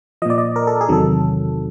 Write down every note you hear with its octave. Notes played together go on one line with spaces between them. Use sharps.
A#2 F3 D5 D#5
D#5
A#4
A4
G#4
E2 C3 D#3 F#3 A4